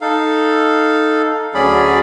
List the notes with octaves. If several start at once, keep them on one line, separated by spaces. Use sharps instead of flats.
D#4 A4 F5
D2 F#3 C#4 G#4 D5 B5